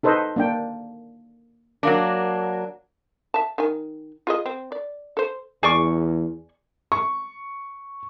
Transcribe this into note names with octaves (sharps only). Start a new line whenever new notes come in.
D#4 A4 B4 C5 D#5
A#3 D4 G5
F#3 A#3 D4
E5 A5
D#3 G#5
F4 G#4 D#5
C4
D5
A4 C5
E2 G#4 D5 C#6
C#6